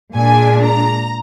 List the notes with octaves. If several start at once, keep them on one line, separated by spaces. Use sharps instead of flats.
A#2 G#3 D4 G#5
A#5